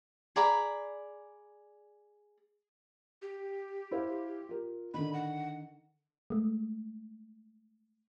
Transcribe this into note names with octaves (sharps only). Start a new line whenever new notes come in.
G#4 D5 A#5 B5
G4
E4 C5 F5
F4 A#4
D3 D#3 B5
F#5
G#3 A3